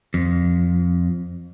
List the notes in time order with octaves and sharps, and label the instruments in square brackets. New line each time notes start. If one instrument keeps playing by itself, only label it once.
[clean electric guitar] F2